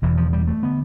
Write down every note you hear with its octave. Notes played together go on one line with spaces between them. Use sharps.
E1 E2 B2 E3
F3
G3
A3
D3 B3